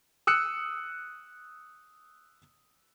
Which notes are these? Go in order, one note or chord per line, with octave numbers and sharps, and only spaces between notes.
D#6 E6 F#6 C#7